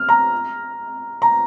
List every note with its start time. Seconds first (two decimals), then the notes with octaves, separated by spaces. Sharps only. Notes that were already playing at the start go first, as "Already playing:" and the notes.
Already playing: F6
0.09 A#5
1.22 A#5